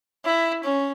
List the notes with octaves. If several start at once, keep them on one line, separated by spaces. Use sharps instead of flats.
E4
C#4